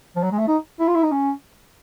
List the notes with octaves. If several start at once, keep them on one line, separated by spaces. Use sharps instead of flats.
F3
F#3
G#3
A3
D#4
E4
F4
E4
D#4
C#4